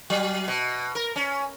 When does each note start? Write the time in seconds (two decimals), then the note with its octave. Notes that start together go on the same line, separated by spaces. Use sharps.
0.10 F#3
0.48 B2
0.95 A#4
1.16 C#4